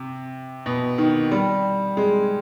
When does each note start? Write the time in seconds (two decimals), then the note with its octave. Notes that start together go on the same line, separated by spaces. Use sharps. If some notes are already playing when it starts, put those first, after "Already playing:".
Already playing: C3
0.66 B2
0.98 D#3
1.31 G3
1.97 G#3